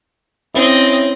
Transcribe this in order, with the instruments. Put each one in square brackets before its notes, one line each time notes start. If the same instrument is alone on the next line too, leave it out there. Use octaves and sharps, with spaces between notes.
[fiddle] C4 D#5 [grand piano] C#4 E4